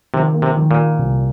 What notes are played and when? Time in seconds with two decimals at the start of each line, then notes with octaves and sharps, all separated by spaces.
0.14 C3 D#3
0.34 A#3
0.42 C3
0.57 D#3
0.71 A#2
0.78 F4
0.99 C2